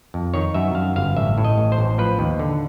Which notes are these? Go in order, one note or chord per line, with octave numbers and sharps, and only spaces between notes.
F2
D#3 C#5
F#2 E5
F#2 F5
G1 F5
A1 E5
A2
D#5
A1
C5
A1
F3 B4
D#2
D3